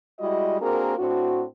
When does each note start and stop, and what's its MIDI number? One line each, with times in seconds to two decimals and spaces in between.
0.20 0.59 55
0.20 0.59 56
0.20 0.59 64
0.20 0.59 66
0.20 0.59 75
0.60 0.96 58
0.60 0.96 60
0.60 0.96 62
0.60 0.96 66
0.60 0.96 68
0.60 0.96 70
0.98 1.43 45
0.98 1.43 60
0.98 1.43 62
0.98 1.43 66